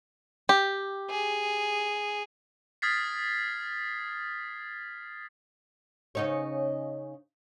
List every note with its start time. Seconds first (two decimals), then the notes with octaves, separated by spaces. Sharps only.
0.49 G4
1.10 G#4
2.82 D#6 F6 G#6 A6 B6 C7
6.15 C#3 D#4 C#5